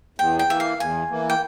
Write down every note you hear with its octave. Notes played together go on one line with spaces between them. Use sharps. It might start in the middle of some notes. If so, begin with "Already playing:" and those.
E2 G5
G5
E3 A#3 E5
F5
E2 G#5
E3 A#3
G5